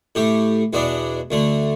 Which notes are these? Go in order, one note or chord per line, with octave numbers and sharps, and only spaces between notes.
A2 A3 G4
E2 B2 B3 D4
D2 D3 A3